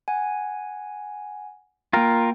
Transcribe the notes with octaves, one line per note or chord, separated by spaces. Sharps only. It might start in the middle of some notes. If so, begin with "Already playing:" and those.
F#5 G#5
A#3 F4 A#4 G5